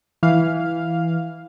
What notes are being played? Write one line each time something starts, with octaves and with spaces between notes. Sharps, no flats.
E3 F5